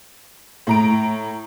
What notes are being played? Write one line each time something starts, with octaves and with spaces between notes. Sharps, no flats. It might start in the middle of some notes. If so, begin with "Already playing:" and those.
A2 A#5 D7